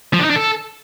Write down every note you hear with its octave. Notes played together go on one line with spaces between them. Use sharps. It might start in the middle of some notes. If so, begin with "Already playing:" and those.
F3
D4
D#4
D4
A4